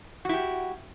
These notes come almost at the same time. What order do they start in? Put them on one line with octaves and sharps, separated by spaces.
F#4 E4 G4